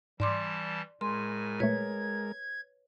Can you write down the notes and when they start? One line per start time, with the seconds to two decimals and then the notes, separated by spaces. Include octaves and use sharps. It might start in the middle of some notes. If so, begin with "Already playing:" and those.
0.20 G#2 E3 G3 D5 A5 C6 D6
1.01 A2 G#3 A#4 G#5 C6
1.60 A#2 F#3 A3 B4 C#5 G#6